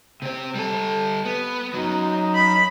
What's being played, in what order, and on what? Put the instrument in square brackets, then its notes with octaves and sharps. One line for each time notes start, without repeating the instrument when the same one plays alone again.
[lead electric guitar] C3 C4
G3 A4
B3
[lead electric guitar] F#2 F#3 [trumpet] D#4
[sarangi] B5